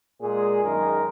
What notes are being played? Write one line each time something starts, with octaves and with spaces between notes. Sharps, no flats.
A#2 G#3 G#4
F#2 D#3 G#3 A#4